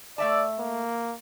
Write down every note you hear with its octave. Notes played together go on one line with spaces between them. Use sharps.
A3 D5 E5 A5
A#3